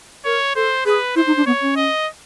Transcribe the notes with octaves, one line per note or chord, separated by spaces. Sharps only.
A#4 C#5
A4 C5
G#4 B4
E4 C5
D#4
D4
B3 C#5
C#4
D#5